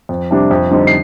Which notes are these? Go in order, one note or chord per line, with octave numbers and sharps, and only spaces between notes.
F2
C3 G3 D4
F2
D3 G3 C4 D#4
C7